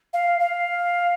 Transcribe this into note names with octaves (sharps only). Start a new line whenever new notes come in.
F5
F5